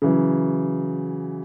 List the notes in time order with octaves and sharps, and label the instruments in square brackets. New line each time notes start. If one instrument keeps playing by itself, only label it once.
[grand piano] C#3 E3 F#3